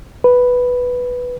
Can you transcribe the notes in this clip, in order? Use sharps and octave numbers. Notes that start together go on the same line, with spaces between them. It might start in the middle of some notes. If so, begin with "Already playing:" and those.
B4